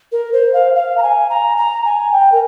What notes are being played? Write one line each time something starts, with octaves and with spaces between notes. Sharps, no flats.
A#4
C5
F5
F5
A#5
G#5
A#5
A#5
G#5
G5
A#4